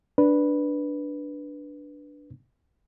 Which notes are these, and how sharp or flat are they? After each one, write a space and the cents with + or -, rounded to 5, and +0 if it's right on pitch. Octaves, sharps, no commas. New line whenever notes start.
D4 +0 B4 -5